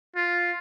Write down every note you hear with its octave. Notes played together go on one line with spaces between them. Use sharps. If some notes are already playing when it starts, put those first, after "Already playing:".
F4